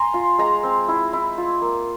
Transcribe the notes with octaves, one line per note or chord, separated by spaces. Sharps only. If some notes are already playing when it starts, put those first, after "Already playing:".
Already playing: G#5 A#5 C6
F4
G#3 A#5
C4
E4
E4
F4
A#3